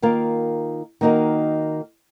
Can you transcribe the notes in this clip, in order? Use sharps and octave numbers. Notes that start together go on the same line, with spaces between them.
D#3 A#3 F4 A#4
D#3 A#3 D#4 F#4 A#4